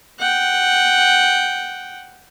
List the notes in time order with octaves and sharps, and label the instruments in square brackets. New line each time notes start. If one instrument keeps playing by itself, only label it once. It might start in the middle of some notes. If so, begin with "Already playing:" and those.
[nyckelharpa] F#5 G5